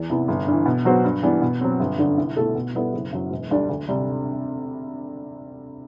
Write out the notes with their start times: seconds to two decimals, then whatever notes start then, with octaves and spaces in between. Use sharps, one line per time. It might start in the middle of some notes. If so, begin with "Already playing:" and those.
Already playing: E2
0.10 C3 E3 B3 E4
0.28 G1
0.47 G2 E3
0.65 B2
0.85 F#3 B3 F#4 C5
1.04 G2
1.23 E3 G3 B3 D4
1.42 B2
1.61 F#3 C4
1.79 G1
1.98 F#2 D3
2.17 C2
2.36 B2 A3 E4 A4
2.55 B2
2.75 G3 B3 E4 A4
2.93 F#1
3.13 F#2 F#3
3.31 E1
3.51 D2 D3 G3 D4
3.69 D2
3.88 C3 G3